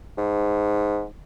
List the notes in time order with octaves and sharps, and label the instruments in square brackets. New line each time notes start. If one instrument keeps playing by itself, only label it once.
[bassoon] G#2